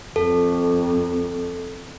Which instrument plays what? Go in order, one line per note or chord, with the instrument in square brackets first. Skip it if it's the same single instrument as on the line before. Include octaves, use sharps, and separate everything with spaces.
[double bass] F2 [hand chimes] A4